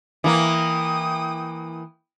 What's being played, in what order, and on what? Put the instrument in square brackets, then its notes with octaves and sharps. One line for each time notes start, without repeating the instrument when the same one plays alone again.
[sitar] E3 A#3 [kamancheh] G5 D#6